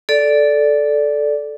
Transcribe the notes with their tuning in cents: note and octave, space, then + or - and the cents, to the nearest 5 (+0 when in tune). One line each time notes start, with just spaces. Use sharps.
A4 -10 D5 +0